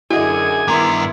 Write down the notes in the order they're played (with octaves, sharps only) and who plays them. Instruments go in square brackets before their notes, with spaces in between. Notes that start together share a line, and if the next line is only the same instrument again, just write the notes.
[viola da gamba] F#2 D3 G#4 [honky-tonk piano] E4 F#4 D#5 [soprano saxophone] G#5
[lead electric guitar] G2 A#5 [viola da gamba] D#3 B3 E4 [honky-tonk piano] C6 D6